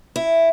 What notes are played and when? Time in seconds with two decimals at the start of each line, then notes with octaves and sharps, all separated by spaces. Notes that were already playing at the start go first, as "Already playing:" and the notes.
0.16 E4